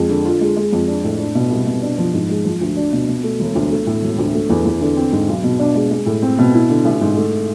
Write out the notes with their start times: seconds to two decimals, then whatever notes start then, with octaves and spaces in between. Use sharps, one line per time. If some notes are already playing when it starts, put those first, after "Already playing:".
Already playing: F2 G#3
0.09 D3
0.25 F4
0.41 G#3
0.56 G#3
0.73 F2
0.88 D4
1.04 A2
1.19 D4
1.35 B2
1.51 C2
1.67 B2
1.82 D4
1.98 F3
2.14 G#2
2.29 G#3
2.45 F3
2.61 D2
2.77 D4
2.92 B2
3.08 B2
3.23 A3
3.40 E1
3.55 D2
3.71 A3
3.87 A2
4.02 E1
4.18 D2
4.33 A3
4.50 E2
4.65 E2
4.81 D3
4.96 C4
5.12 G#2
5.28 B1
5.44 B2
5.59 D4
5.75 G#3
5.91 G#3
6.06 A2
6.22 C4
6.38 B2
6.54 E4
6.70 D3
6.85 A1
7.01 G#2
7.17 A3